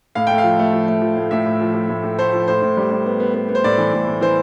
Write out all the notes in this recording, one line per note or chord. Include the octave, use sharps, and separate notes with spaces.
A2 F5
A3 G5
F5
F3
A3
F3
A3
F3
A2
A2 E5
A2
F3
F3
A2
A2
A3 C5
F3
A2 C5
A2
G3
G3
B3
B3
B3
B3
C5
A2 D5
E3
A2
A2
E3 C5